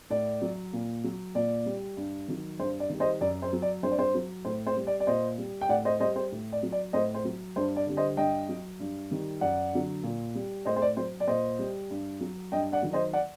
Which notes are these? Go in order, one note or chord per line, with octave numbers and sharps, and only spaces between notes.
A2 D5
F#3
A#2
F#3
A#2 D5
G3
G2
D#3 F#3
G2 C5
D5
D#3 G3
C5 D#5
F#2 D5
C5
F#3
D5
G2 C5
D5
C5
F#3
A2 C5
C5
G3
D5
D5
A#2 C5 D#5
G3
G5
A2 D5 F#5
C5 D#5
G3 C5 D#5
C5
A2
D5
F#3
D5
A2 C5 D#5
C5
F#3
G2 C5
D5
D3 G3
C5 D#5
G2 D#5 G5
F#3
G2
D#3 G3
F#2 D5 F#5
D3 F#3
A#2
G3
A2 C5 D#5
C5
D5
F#3 C5
D5
A#2 C5 D#5
G3
G2
F#3
G2 D#5 G5
D5 F#5
D#3 F#3
C5 D#5
D5 F#5